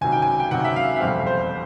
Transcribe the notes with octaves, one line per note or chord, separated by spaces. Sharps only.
C#2 C3 D#3 F#3 G#5
G5
G#5
G5
C#2 C3 D#3 F#3 F#5
E5
F5
E5
F1 E2 B2 G3 C4 F5
C5